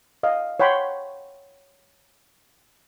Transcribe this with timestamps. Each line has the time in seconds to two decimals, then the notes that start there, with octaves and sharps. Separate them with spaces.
0.23 D#5 F5
0.60 C#5 F#5 G5 B5 C6